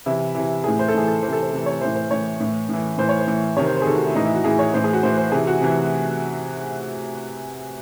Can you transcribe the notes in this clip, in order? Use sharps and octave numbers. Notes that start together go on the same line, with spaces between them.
C3 E3 E4
C3 E3
A2 E3 G#4
C5
A4
A2 E3 G#4
A4
C3 E3 C5
A4
C5
C3 E3
C#5
A2 E3 C5
C5
A2 E3 C#5
A2 E3
A2 E3
A2 E3 C5
C#5
C5
A2 E3
C3 D#3 C#5
C5
C5
G#4
C3 D#3 A4
F#4
E4
A2 E3 D#4
E4
F#4
A2 E3 G#4
C#5
A2 E3 C5
G#4
F#4
A2 E3 C5
C5
C3 E3 G#4
F#4
C3 E3